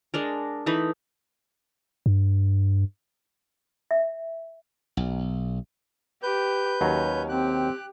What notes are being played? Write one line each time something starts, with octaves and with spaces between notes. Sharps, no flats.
G#3 D4 A#4
E3 A3 D#4 B5
G2
E5
B1
G4 B4 G6
D#2 F#3 C#4
C4 G4 F#6